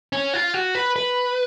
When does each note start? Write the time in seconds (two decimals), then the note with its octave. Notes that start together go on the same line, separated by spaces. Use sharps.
0.13 C#4
0.33 F4
0.54 F#4
0.75 B4
0.96 B4